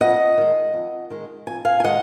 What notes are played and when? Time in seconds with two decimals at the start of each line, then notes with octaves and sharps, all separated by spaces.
0.01 F2 D#5 F#5
0.37 D#3 G#3
0.73 F2
1.10 D#3 G#3
1.47 F2 G#5
1.65 F5 G#5
1.80 G#5
1.84 D#3 G#3 D#5 F#5